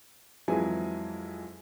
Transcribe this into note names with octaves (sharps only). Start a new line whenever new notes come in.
F2 E3 F#3 G#3 E4 G#5